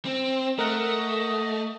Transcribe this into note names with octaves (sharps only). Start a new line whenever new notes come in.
C4
A3 A#4 D#5 F#5